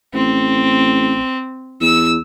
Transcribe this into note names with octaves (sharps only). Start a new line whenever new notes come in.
A1 C4
E2 E6